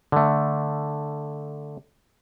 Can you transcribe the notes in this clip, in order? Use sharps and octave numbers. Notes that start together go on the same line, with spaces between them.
D3 A3